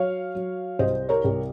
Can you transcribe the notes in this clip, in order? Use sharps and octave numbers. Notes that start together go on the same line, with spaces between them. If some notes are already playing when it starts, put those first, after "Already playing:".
Already playing: F#3 C#5 F5
F#3
C2 C5 D#5
A#4 C#5
C2